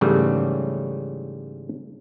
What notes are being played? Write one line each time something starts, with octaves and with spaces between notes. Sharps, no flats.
G#2 C#3 E3 F#3 G3 A3